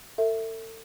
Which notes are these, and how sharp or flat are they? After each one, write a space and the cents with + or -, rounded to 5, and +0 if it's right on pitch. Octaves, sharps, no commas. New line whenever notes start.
A4 +35 E5 +0